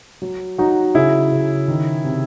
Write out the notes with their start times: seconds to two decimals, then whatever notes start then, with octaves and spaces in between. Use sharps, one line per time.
0.22 F#3
0.58 F#3 D#4 F#4
0.95 C#3 E4 G#4
1.32 C#3
1.68 D#3
2.05 C3